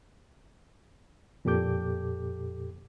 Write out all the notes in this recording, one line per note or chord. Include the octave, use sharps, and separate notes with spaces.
F2 A#2 G4 A4 D6 G6